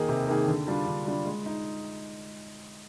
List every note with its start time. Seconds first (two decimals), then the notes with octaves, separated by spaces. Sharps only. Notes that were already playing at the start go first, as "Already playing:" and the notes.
Already playing: D#3 A#3 D#4 G#4
0.09 C3
0.27 D#3 A#3 D#4 G#4
0.48 D3
0.67 G3 D4 F4
0.87 D3
1.06 G3 D4 F4
1.26 G#3
1.46 D#4